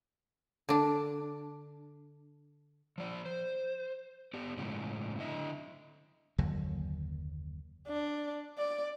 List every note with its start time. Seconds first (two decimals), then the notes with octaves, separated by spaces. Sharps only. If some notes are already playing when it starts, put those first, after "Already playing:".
0.69 D3 D4
2.98 F3 D5
3.25 C5
4.33 B3 G4 D5
4.57 A2 C#3 F3 G#3
5.19 D3 E4 D#5 E5
6.38 F#1 D#2 D3 F#3
7.88 D4
8.58 D5